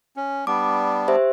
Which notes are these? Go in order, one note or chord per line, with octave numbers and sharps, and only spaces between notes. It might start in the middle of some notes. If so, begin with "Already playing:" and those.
C#4
G3 B3 D4 D6
G4 C5 E5